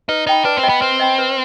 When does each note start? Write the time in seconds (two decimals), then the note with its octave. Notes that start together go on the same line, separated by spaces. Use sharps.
0.09 D#4 B4
0.26 D#4 D#5 G5 B5
0.45 D4 B4
0.57 C4
0.63 D#5 G5 B5
0.69 B3
0.81 C4 B4
1.00 D#5 G5 B5
1.18 B4